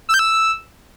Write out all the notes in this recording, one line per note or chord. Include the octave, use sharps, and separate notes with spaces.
E6
G6
E6